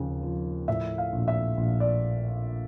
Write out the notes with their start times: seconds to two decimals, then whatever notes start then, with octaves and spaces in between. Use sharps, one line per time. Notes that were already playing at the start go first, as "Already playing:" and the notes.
Already playing: D#2 C#3 F3
0.23 F3
0.68 A2 E5
0.98 F5
1.13 A#1
1.28 E5
1.57 A#1
1.80 D5